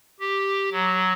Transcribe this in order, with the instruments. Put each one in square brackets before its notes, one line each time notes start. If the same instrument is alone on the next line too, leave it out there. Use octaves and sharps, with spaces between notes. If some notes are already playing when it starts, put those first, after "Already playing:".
[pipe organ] G4
F#3